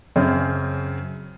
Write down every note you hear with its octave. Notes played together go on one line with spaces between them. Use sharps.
F#2 C#3 C4